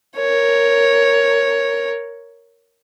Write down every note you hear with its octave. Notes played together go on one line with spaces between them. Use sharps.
A#4 C#5